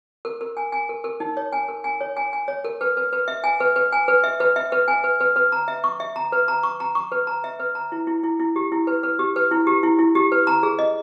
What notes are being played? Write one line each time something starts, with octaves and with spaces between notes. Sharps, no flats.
A#4
A#4
G#5
G#5
A#4
A#4
D#4
C#5
G#5
A#4
G#5
C#5
G#5
G#5
C#5
A#4
B4
B4
B4
E5
G#5
B4
B4
G#5
B4
E5
B4
E5
B4
G#5
B4
B4
B4
A#5
E5
C#6
E5
A#5
B4
A#5
C#6
A#5
C#6
B4
A#5
E5
B4
A#5
E4
E4
E4
E4
G4
E4
B4
B4
G4
B4
E4
G4
E4
E4
G4
B4
A#5
G#4
D#5